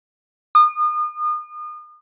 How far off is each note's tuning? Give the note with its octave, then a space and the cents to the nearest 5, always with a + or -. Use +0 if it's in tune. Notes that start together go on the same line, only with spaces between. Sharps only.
D#6 -35